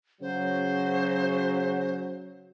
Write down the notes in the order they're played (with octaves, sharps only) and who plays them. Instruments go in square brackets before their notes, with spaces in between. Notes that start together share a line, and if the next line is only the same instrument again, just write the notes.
[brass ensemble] C#3 F#3 [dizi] C5